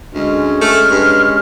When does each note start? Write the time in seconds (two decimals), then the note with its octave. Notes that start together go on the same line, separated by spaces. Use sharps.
0.14 D2 G#3 C#4
0.61 A3 F6
0.91 G2